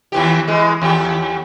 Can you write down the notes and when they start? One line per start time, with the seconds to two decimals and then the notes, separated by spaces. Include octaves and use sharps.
0.12 D#2 E3 G4
0.48 E3 G#3
0.82 D#2 G4